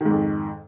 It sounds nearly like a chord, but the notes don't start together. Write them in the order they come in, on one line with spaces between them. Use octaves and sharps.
D#3 G#2 F2